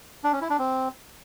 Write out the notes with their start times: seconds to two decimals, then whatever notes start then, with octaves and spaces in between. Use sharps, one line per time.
0.24 D4
0.33 C#4
0.41 E4
0.50 D4
0.59 C4